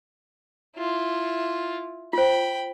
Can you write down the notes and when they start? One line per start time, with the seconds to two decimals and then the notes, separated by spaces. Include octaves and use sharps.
0.76 E4 F4
2.13 F4 C5 G5 B5